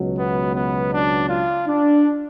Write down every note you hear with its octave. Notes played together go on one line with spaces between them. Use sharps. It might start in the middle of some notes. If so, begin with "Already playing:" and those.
Already playing: C#2 B2 F#3
B3
B3
D4
F4
D4